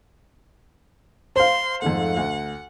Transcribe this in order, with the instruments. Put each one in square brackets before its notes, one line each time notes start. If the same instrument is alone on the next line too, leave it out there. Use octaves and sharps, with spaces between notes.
[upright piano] C5 F5 [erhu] C6
[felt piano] F2 G#2 A3 [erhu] F#5
[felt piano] D2